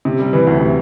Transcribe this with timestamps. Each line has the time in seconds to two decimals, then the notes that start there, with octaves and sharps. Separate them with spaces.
0.05 C3
0.19 G3
0.33 E3
0.47 D2
0.61 C3